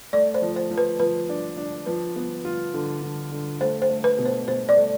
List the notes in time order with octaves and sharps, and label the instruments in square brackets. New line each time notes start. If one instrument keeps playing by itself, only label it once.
[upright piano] A3 [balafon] D5
[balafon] C5
[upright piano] F3
[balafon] C5
[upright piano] F3
[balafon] B4
[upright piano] F3 [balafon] B4
[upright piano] D4
D4
[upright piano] F3 [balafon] B4
[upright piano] B3
F4
D3
D3
D3
[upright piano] A3 [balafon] C5
[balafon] C5
[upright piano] A3
[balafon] B4
[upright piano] B2
[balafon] C5
[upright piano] B2 [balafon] C5
[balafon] D5
[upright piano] A3